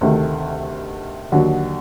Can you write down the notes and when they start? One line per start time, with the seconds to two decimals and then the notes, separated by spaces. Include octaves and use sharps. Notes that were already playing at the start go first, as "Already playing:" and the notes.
0.01 D2 C3 D#3 A3
1.32 D#2 D3 F#3